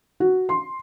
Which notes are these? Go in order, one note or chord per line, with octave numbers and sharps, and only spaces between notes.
F#4
C6